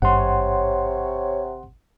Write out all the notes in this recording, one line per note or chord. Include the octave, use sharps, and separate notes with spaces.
G#1 G2 C3 C#5 F#5 C6